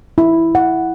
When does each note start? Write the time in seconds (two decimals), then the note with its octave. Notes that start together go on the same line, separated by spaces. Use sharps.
0.18 E4
0.55 F#5